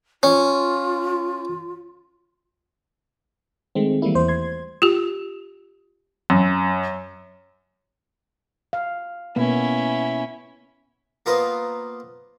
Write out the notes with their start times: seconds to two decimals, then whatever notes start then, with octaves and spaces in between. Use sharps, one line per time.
0.23 C#4 F4
3.75 D#3 G#3 A3 C4
4.02 E3 G3 A3 A#3 E4
4.15 E2 C5
4.28 C6 G#6
4.82 F4 G4
6.30 F#2
8.73 F5
9.36 B2 A#3 B3 C#4 E4
11.26 A#3 B3 F4 B4 C5 D#5